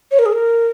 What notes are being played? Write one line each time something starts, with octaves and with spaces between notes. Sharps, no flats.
C#5
A#4
G#4
A#4